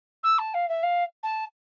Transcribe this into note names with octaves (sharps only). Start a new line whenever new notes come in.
E6
A5
F5
E5
F5
A5